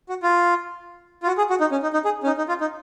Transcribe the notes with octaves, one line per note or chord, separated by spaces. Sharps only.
F#4
F4
F4
F#4
G#4
F#4
D#4
C#4
D#4
D#4
G#4
C#4
D#4
D#4
F4
D#4